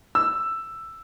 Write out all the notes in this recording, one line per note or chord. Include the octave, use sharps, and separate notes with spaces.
E6